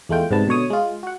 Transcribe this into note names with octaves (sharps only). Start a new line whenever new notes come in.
E2 G#3 A3 F4 G5
G#2 C3 G3 B3 B4 A5
B2 D3 C#5 D#6
G#3 F4
F#4 F#5